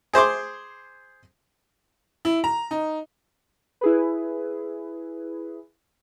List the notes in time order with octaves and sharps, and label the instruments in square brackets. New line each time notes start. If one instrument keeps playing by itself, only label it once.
[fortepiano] G#4 C5 C6 D6
[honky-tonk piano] E4
A#5
D#4
[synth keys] E4 G#4 B4